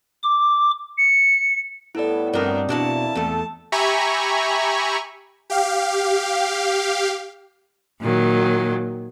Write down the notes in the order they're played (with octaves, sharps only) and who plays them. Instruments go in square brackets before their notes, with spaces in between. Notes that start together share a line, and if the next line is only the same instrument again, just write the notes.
[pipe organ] D6
[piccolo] C#7
[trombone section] A2 G3 B3 [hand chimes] E4 D5 [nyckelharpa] A4
[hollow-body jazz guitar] G2 A#4 [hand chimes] C4 D5 [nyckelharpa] D4 D#4
[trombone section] E2 A#3 E4 [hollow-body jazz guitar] B2 D4 F#4 [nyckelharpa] A5
[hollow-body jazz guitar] E2 A3 [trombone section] A4
[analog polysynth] G4 E5 G#5 A#5 B5 C#6
[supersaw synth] G4 F5
[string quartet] A#2 D#3 F#3